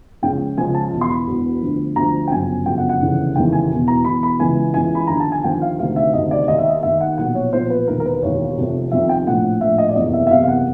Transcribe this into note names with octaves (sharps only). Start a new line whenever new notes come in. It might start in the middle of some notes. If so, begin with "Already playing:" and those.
C#2 C#3 F3 G5
C#2 C#3 F3 G#5
A5
E1 E2 B2
C6
B5
E1 E2 B2
D2 D3 F3
D2 D3 F3 A#5
G5
G1 F#2 C#3 F3 G#5
G1 F#2 C#3 F3 G5
F#5
F#5
F1 D#2 C#3 E3
F1 D#2 C#3 E3 G5
G#5
E1 E2 B2
A#5
E1 E2 B2 B5
B5
C#2 C#3 E3 G#5
C#2 C#3 E3 G#5
B5
D#2 D3 F3 A#5
A5
G#5
D#2 D3 F3 G5
F5
D2 C3 D#3 F5
E5
D2 C3 D#3 D#5
D5
D#2 D#3 D#5
E5
D#5
D#2 D#3 E5
F#5
B1 A#2 F3 F#5
C#5
B1 A#2 F3 C5
B4
E1 D#2 D#3 A#4
A#4
B4
E1 D#2 D#3 C#5
F1 F2 C3 D#3
F1 F2 C3 D#3 E5
G5
A#1 A2 F3 F#5
A#1 A2 F3 E5
D#5
D5
F#1 E2 C3 D#5
E5
E5
F#1 E2 C3 F5
F5
F#5